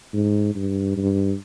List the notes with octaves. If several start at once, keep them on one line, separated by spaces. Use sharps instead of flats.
G#2
G2
G2